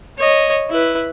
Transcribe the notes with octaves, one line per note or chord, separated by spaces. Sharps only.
C#5 D#5
E4 B4